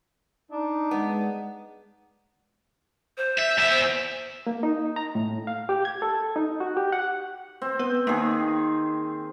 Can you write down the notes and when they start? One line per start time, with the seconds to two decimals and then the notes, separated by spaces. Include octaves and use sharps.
0.52 D4 D#4
0.91 G#3 B3
3.17 C5
3.38 E5
3.58 E2 E5
4.47 A#3
4.63 D#4
4.96 A#5
5.15 A2
5.47 F5
5.69 G4
5.85 G#6
6.02 A4
6.36 D#4
6.60 F#4
6.77 G4
6.92 F#5
7.62 C4
7.79 B3 B4
8.07 D#3 A#3 G#4